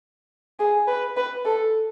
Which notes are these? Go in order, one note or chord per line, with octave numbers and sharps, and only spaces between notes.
G#4
B4
B4
A4